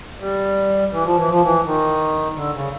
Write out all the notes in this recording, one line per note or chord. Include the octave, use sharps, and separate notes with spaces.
G3
E3
F3
E3
F3
E3
D#3
D3
C#3